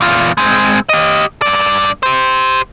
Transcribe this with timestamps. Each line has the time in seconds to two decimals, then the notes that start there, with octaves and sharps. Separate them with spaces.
0.01 E2 F4
0.37 G#3 C4
0.89 G4 D#5
1.42 G2 D5
2.03 G4 C5